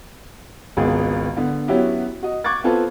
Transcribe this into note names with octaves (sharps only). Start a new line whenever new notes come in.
G#1 C#2 B3 G#4
D3 B3
F#3 B3 C#4 E4 F#4 G4
F#4 D#5
C#6 D6 F#6 G#6 A6
B3 C4 F4 A4 B4